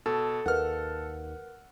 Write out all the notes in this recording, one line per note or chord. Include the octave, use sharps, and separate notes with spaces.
B2 A4
D#2 A#4 B4 F#5 F6